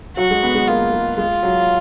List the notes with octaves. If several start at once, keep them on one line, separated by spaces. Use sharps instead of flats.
F#3 F#4
G#3
B3
G#3
A#3 F4
G#3
G#3 F4
F#3